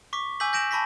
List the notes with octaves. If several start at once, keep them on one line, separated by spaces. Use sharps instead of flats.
C#6 D6 B6
G#5 D6 E6 G6 B6 F#7
G6 A#6 D7 E7 F#7
A5 B5 C#6 A#6 B6